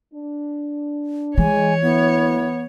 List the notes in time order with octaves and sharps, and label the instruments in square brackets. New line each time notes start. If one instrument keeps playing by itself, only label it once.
[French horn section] D4
[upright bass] E3 [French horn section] G#3 [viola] C#5 [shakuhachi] G#5
[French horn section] D2 A#3 E4 [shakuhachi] B3